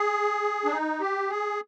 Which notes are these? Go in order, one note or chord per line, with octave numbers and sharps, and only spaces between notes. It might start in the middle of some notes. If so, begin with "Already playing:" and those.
Already playing: G#4
D4
D#4
G4
G#4